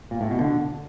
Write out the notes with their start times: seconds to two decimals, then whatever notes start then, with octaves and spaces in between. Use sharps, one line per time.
0.11 A#2
0.21 A2
0.31 B2
0.40 D3